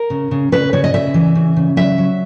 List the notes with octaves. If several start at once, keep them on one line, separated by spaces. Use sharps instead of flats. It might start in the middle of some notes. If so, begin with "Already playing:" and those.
Already playing: A#4
C#3
C#3
C#3 B4
C#3 C#5
D#5
C#3 E5
E3
C#3
C#3
F#3 E5
F#3